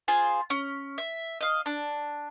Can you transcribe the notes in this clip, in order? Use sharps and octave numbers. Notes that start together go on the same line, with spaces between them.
F4 G#4 C5
C#4
E5
D#5 F5
D4